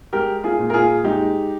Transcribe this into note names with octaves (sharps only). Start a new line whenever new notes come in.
G#3 G4 A#4
F4 G#4
A#2
A#4
F4 G#4
G#3 D#4 G4